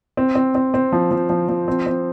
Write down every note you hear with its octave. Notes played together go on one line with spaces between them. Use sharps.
C4
C4
C4
C4
F3
F3
F3
F3
C4
C4